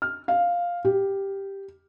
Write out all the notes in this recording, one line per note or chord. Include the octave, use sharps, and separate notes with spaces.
F6
F5
G4